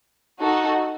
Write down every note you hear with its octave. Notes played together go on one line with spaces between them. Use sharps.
D#4 F#4 A4